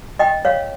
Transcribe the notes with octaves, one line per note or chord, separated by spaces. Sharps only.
D#5 G5
C#5 F5